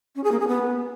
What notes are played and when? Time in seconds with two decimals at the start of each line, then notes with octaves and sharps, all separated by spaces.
0.16 C#4
0.24 G#4
0.32 A#3
0.40 G#4
0.48 B3